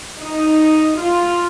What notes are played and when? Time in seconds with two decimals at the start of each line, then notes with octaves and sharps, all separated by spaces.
0.22 D#4
0.99 F4